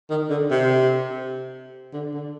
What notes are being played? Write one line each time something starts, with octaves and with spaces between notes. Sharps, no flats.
D#3
D3
C3
D3
D3